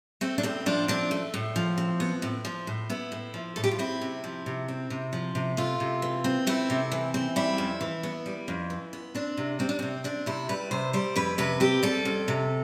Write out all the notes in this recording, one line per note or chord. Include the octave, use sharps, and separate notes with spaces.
A3 C4
D4
A2 C4
F3 D4
C4 D4
A3
A2
F3
C4
B3
A2
F3
A2
B3 E4
A2
F3
A2 A4
G4
F4
C4 E4
C3
F3
C3
C4
C3
F3
C3
A3 F4
C3
E3
C4
A3 E4
C3
E3
C4
G3 E4
F2
E3
B3
G3
F2
E3
B3
C4 D4
C3
G3 C4
D4
C3 C4
C4 D4
C3 E4
G3 B4
C3 C5
G3 C5
F2 B4
C3 B4
C4 G4
G3 A4
F2
C3